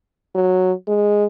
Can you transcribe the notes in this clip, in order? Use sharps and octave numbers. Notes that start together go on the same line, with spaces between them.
F#3
G#3